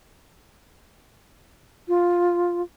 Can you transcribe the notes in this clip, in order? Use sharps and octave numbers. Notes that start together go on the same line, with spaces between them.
F4